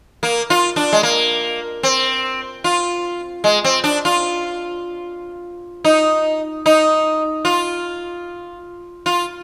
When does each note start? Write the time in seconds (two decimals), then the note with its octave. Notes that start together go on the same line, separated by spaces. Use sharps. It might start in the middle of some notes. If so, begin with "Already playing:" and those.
0.23 A#3
0.50 F4
0.76 D4
0.93 G#3
1.03 A#3
1.83 C4
2.64 F4
3.44 G#3
3.64 C4
3.84 D4
4.05 F4
5.84 D#4
6.66 D#4
7.45 F4
9.06 F4